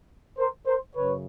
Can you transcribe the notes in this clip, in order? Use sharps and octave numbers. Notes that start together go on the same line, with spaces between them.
A#4 C5
A#4 C5
F#2 C#3 B4 C#5